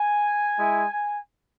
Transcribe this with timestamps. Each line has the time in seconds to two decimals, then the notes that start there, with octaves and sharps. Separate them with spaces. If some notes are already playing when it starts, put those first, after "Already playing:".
Already playing: G#5
0.57 G#3 E4